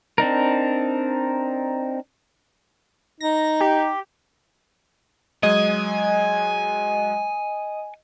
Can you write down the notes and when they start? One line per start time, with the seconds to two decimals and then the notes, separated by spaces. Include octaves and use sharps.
0.18 C4 D4 D#4 A#4
3.21 D#4 A#6
3.61 G4
5.43 F#3 G#3 D#5 G#5